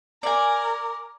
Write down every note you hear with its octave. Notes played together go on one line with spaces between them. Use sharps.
A#4 D5 G#5